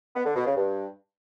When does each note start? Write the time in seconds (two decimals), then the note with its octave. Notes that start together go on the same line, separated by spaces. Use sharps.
0.16 B3
0.26 D3
0.36 B2
0.46 C#3
0.57 G2